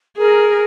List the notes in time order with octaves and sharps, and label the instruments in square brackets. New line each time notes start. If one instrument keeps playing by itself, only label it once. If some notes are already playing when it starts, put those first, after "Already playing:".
[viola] G#4 [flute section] A#4